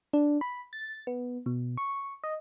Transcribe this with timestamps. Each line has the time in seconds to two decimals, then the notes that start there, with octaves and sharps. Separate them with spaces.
0.13 D4
0.41 B5
0.73 A6
1.07 B3
1.46 B2
1.78 C#6
2.24 D#5